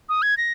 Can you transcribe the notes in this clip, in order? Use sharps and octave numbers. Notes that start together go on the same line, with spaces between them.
D#6
G#6
A#6